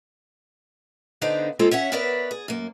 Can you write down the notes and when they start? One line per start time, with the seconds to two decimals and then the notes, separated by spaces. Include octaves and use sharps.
1.22 D3 B3 D4 D#4 C5 F5
1.59 G#3 A#3 C4 F4 A4
1.71 C#4 C#5 E5 F#5
1.92 B3 A#4 B4 C#5 D5 E5
2.31 G#4
2.48 F#2 A#3